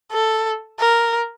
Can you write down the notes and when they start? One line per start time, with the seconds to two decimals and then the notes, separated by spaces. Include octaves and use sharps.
0.12 A4
0.80 A#4